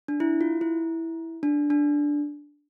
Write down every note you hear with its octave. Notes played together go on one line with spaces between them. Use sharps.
D4
E4
F4
E4
D4
D4